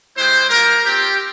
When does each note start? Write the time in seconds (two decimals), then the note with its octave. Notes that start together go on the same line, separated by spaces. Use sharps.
0.16 G#3 E4 G4 C5
0.50 G3 A#3 F4 A#4
0.85 C4 F4 G4